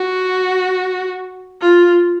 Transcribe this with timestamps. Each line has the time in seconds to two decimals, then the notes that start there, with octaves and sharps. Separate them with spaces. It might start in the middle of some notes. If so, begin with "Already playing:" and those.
Already playing: F#4
1.61 F4